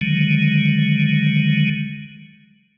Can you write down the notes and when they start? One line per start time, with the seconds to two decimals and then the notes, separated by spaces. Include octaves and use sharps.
0.01 D3 D#3 F#3 G#3